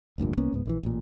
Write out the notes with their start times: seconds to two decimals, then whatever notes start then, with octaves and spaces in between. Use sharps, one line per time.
0.18 F1 D2 G2 A#2
0.37 C2 A#3 B3 C#4
0.53 C#2 G#2 B3
0.66 A#1 D3 E3
0.83 A1 A#2